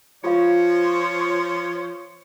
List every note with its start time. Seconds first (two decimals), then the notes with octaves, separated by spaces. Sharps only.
0.24 F3 F4 A4 C5 C#5 F5